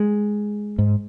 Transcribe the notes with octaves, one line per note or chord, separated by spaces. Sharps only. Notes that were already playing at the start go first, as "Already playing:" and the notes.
Already playing: G#3
G#2